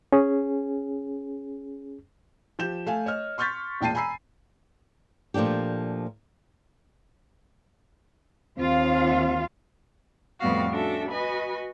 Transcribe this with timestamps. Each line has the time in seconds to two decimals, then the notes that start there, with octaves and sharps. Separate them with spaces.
0.12 C#4 G#4
2.59 F3 G4 G6 E7
2.86 A3 F5 G#5
3.06 C#5 D#5 F6
3.38 C6 C#6 F6 G6 A6 B6
3.81 E1 A#2 G5 A5 C7 D#7
3.95 G#5 A#5 B5 E6 C7
5.34 A#2 F3 A3 D4 G4
8.58 D#2 C4 F4 F5
10.39 F2 A2 G3 B3 F#4 F5
10.70 C#4 D4 F#4 A4 E5
11.09 F#4 B4 D#5 G#5 B5